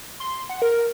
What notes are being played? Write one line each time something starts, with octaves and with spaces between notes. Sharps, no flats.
C6
F#5
A#4